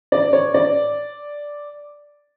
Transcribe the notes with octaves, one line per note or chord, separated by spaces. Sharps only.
D5
C#5
D5